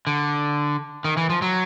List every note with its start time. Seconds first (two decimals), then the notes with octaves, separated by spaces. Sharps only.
0.07 D3
1.05 D#3
1.17 E3
1.30 F3
1.42 F#3